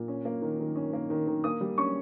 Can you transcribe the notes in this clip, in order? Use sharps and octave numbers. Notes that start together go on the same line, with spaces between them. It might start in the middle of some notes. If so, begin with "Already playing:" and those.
Already playing: A#2
C#4
A#3
D#3
D#3
C#4
A#3
D#3
D#3
A#3 D#6
G3
C#4 C#6